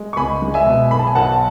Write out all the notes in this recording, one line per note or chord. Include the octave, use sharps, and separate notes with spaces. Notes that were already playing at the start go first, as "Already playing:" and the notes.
Already playing: G#3
C#6
C#2 G#5 B5
G#3
E5 G#5
B2
B1 B5
A5
G#5
B1 F#5 A5